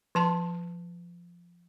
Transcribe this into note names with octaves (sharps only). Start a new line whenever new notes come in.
F3 A5 C6